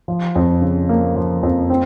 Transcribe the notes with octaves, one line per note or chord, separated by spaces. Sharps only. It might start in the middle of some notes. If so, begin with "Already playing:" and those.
F3
F2
C#3
A#3
F3
F2
C4